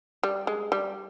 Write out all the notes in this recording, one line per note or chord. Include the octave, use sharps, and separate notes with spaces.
G3
G#3
G3